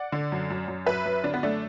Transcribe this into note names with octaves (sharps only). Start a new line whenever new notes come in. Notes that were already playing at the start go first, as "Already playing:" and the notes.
Already playing: D5 F#5
D3
F#2
F#2
F#2
F#2 B4 E5
F#2
D3 D4
B3
F#2 A3 D4